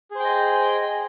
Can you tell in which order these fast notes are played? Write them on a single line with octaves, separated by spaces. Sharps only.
G#4 C5 G5 D#5